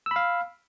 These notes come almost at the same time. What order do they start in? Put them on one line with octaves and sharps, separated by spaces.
E6 B5 F5